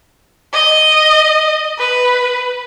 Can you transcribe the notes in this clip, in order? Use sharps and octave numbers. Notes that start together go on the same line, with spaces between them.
D#5
B4